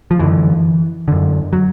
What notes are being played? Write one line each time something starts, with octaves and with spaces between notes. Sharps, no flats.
F3
F#2 D3 E3
F#2 D3
F#3